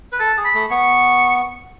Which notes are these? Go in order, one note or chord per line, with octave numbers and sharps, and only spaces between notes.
B4
A4 A5
G#4
B5
A3
B3 C#6